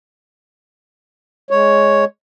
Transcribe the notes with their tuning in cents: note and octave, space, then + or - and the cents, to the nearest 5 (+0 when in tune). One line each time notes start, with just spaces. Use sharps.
G#3 +5 C#5 +0